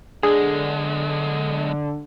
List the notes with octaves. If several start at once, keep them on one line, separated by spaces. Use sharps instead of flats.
B1 D3 G#3 G#4